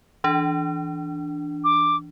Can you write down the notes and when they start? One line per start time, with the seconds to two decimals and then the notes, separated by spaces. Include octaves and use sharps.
0.24 E3 D4
1.64 D6